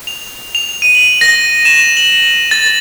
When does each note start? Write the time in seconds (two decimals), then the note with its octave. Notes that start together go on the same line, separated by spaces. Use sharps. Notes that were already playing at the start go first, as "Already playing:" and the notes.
0.07 F7
0.55 F7
0.82 D#7
0.95 F#7
1.21 A#6
1.65 E7
1.97 F#7
2.51 A6